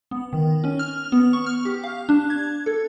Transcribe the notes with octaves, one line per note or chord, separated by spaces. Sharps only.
B3
D#3
C#4
F6
B3
C#6
F6
G4
F5
D4
G#6
A4